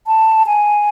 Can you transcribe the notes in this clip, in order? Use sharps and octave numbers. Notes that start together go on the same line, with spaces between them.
A5
G#5